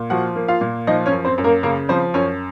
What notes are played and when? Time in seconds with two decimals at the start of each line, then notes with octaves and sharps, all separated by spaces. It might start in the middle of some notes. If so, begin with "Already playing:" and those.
Already playing: A#2
0.10 F3 F#4 F#5
0.36 A#3
0.48 F4 F5
0.61 A#2
0.87 F3 D#4 D#5
1.06 C#4 C#5
1.12 F#2
1.25 C4 C5
1.38 F#2
1.44 A#3 A#4
1.63 C#3 A#3 A#4
1.89 F3 C4 C5
2.14 F#2 C#4 C#5